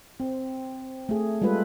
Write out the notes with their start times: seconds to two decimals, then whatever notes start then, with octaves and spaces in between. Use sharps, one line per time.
0.20 C4
1.09 A3 G#4
1.42 G3 G#3 F4 A4 B4